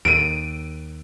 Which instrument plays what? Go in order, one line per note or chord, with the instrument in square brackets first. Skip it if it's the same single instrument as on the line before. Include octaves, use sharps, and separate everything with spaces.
[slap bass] D#2 [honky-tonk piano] D7 D#7